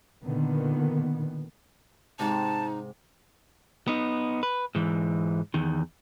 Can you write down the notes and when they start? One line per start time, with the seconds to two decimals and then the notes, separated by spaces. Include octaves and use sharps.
0.24 A#2 D3 D#3 B3
2.19 G#2 C3 D#4 A5
3.88 B3 D#4
4.43 B4
4.75 G#2 E3
5.54 E2 D#3